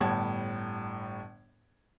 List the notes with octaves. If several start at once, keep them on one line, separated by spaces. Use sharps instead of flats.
G1 A2 G3 F#5 A5 G#6